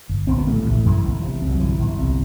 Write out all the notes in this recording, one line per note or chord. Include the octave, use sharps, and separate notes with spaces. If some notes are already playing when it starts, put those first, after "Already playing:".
G1
G1 C4
B3
A1 A3
A1
F#2 E3
G1
C3
C2
F#3
G1 E3
G1
C2